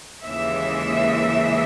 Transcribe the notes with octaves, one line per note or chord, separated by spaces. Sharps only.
D#2 C#3 E3 G#3 E5